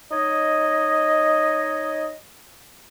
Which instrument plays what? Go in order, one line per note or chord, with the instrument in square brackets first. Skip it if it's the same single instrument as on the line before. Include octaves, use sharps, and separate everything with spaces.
[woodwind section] D#4 C#5 D#5